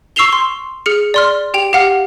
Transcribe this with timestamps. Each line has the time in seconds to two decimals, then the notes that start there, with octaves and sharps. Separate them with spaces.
0.16 C#6 E6 C7 E7 F7 G7
0.33 C6
0.86 G#4 F6 C#7
1.14 D5 C6 F6
1.54 G4 G5 F7
1.73 G4 F5 F#5 F6